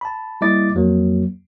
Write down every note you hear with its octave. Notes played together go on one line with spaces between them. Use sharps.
A5 B5
G3 A#3 E4 D#5 D6 A6
F2 F#3 A#3